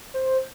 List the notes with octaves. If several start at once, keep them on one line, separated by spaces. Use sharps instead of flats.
C5